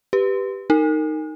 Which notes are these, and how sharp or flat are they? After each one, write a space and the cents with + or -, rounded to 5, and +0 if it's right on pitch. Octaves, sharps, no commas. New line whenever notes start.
G4 +0 B4 +0
D#4 +0 A#4 -30